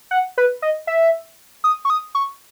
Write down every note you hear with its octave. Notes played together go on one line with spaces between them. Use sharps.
F#5
B4
D#5
E5
D#6
C#6
D#6
C#6